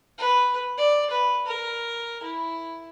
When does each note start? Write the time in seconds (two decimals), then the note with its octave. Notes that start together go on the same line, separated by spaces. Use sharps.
0.18 B4
0.77 D5
1.10 B4
1.46 A#4
2.22 E4